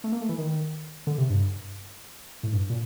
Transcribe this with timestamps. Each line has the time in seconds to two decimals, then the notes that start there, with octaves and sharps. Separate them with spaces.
0.04 A3
0.12 A#3
0.21 A3
0.29 E3
0.38 D#3
1.07 D3
1.18 C3
1.30 G2
2.43 A2
2.53 G2
2.70 A#2